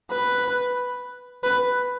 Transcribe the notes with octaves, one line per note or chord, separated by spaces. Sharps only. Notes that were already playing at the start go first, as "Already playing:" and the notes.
B4
B4